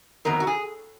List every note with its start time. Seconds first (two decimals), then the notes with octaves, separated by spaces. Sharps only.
0.25 F2 D#3 F#3 B3 A#4
0.40 F#4
0.47 G#4